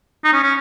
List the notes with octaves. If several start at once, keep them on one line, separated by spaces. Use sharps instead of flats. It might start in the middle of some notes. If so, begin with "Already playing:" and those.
D#4
C#4
C#4